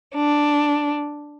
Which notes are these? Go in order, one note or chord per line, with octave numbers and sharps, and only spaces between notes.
D4